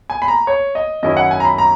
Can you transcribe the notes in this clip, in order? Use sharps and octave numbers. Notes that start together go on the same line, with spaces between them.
G#5
B5
A#5
C#5
D#5
F#2 D#3 F#3 C#4 E4 D#5
F#5
G#5
A#5
B5
A#5